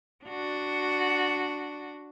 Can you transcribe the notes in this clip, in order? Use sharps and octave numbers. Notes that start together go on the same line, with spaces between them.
D4 F#4